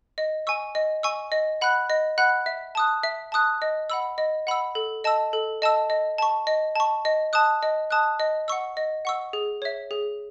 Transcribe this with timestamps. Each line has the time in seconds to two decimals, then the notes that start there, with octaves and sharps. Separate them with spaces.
0.18 D#5
0.47 G#5 C#6 E6
0.75 D#5
1.03 G#5 C#6 E6
1.32 D#5
1.61 F#5 B5 F#6
1.90 D#5
2.18 F#5 B5 F#6
2.46 E5
2.75 A5 D#6 F#6
3.03 E5
3.32 A5 D#6 F#6
3.62 D#5
3.90 F#5 B5 E6
4.18 D#5
4.47 F#5 B5 E6
4.75 A4
5.04 D#5 A5 E6
5.33 A4
5.62 D#5 A5 E6
5.90 D#5
6.18 A5 C#6
6.47 D#5
6.75 A5 C#6
7.05 D#5
7.33 A5 D#6 F#6
7.63 D#5
7.91 A5 D#6 F#6
8.20 D#5
8.48 F#5 C#6 E6
8.77 D#5
9.05 F#5 C#6 E6
9.33 G#4
9.62 C#5 E5
9.91 G#4